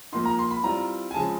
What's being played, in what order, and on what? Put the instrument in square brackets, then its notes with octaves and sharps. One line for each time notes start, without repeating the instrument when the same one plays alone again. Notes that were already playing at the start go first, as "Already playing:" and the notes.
[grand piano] A#2 F3 A#3 D#4 C6
A#5
C6
B5
E3 G3 C4 F4 A#5
G#5
C#3 F3 G#3 C4 A5